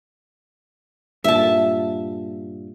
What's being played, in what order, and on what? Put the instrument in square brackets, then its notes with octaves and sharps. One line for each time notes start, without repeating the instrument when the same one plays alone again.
[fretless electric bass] G2 A#2 [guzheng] E5 A5